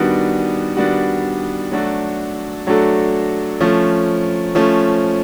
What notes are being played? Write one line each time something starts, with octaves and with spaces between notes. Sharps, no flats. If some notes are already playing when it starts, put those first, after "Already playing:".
Already playing: D#3 G3 B3 D4 F#4
D#3 G3 B3 D4 F#4
F#3 A3 D4 F#4 A4
F#3 A3 D4 F#4 A4
F3 A3 C#4
F3 A3 C#4